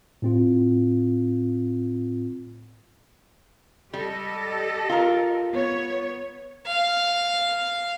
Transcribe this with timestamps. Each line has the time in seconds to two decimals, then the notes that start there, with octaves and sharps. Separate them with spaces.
0.22 A2 C4 F4
3.94 G3 G4 A4 D#5
4.89 F4 A#4
5.52 B3 C#5
6.67 F5